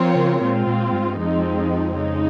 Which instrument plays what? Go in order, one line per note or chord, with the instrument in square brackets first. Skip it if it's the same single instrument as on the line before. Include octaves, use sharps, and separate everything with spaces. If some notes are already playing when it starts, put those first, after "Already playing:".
Already playing: [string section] F3 C4 F4 A#4 C#5
[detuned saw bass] C#3
[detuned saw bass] A#2 [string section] G#3 C4 F4
[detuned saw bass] A#2
G2
G#2
G2
[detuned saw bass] F2 [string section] F3 G#3 C4 D#4
[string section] C#3 G#3 D#4